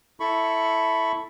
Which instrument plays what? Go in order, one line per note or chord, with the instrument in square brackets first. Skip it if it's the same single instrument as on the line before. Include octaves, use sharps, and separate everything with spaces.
[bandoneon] E4 A4 B5 C#6